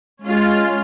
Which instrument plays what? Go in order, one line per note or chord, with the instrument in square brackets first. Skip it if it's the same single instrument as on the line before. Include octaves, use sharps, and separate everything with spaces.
[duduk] G#3 [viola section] C#4 F4